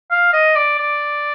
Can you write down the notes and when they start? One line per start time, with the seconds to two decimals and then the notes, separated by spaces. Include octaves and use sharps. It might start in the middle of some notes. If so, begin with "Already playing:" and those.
0.11 F5
0.33 D#5
0.56 D5
0.79 D5